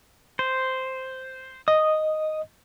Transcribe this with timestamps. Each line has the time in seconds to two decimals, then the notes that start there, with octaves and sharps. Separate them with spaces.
0.39 C5
1.68 D#5 D#6